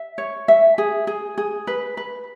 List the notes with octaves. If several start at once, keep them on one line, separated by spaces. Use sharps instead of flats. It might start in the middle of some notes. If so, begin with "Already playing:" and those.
Already playing: E5
C#5
E5
G#4
G#4
G#4
B4
B4